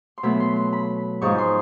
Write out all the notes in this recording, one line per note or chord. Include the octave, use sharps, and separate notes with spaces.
C6
B2 F#3 A3 B5
C6
C6
B5
G#2 F3 G#3 C#6
C6